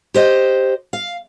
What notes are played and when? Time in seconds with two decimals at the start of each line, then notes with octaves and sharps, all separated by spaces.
0.14 G4 C5 D#5
0.93 F5